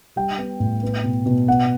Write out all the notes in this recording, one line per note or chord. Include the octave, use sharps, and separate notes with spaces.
G3 G5
B3
A2
B3
B2
B2
B3 F#5